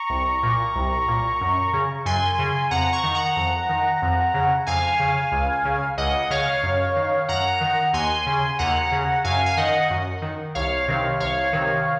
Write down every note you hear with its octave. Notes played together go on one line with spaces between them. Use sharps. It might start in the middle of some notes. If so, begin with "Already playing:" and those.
Already playing: A#5 C#6
C2
A#2
C2
A#2
F#2
C#3
F#2 G#5 C6
C#3
F2 F#5 A#5
A#5 C#6
D#3
F#5 A#5
F2
D#3
F2
C#3
F2 F5 G#5
C#3
C#2
C#3
C#2 D#5 F#5
C#3 C#5 F5
F#2
D#3
F#2 F#5 A#5
D#3
D#2 G#5 C6
C#3
D#2 F#5 A#5
C#3
F#2 F5 G#5
G#5
D#3 D#5 F#5
F#2
D#3
C2 C#5 F5
C3 D#3
C2 C#5 F5
C3 D#3